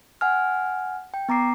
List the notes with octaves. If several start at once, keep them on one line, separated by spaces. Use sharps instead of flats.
F#5 G#5 F6
G5
B3 A#5 D6 C7